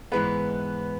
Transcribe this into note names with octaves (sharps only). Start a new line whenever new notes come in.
G#2 E3 G#3 B3 B4